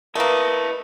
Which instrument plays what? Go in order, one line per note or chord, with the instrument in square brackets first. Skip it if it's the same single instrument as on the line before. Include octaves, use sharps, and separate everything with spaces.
[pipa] A3 A#3 [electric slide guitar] E4 D#5 [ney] A#4 [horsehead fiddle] B4